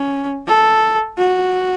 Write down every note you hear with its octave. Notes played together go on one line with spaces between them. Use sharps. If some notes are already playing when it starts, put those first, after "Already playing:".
Already playing: C#4
A4
F#4